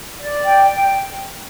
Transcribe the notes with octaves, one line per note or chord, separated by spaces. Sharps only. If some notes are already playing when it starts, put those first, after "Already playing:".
D5
G5